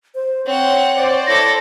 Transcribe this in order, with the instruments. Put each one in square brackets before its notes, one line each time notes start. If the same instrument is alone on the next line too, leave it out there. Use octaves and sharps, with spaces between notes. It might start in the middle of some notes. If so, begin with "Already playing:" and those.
[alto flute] C5
[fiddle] C4 F#5 [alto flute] C#5
[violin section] C5 D5
[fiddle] E4 A4 [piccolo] A#6